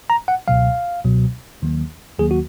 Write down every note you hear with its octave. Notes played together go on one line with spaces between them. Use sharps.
A#5
F#5
C#2 B2 F#3 F5
C#2 B2 F#3
D#2 D#3 F#3 A#3
D#2 D#3 F#3 A#3 G#4
F#4